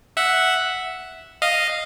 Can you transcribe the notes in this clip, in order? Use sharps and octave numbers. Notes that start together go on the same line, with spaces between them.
E5 F#5
D#5 F5